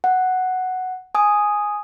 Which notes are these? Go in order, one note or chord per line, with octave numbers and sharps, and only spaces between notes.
F#5
G#5 D#6